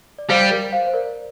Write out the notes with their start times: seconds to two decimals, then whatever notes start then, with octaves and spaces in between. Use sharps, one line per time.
0.18 D5
0.30 G3 C5 F5
0.51 A#4 D5
0.72 C5 F5
0.87 C5
0.94 A#4 D5